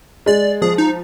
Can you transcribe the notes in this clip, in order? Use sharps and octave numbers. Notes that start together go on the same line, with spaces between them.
G#3 D5
F3 G#4
D#4